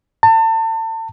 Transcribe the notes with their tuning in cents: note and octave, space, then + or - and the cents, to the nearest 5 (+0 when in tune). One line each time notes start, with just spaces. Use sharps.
A5 +35